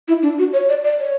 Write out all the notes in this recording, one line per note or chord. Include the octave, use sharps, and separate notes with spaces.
E4
D4
F#4
C#5
D5
D5
C#5